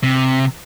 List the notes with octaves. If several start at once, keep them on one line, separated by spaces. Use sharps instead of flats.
C3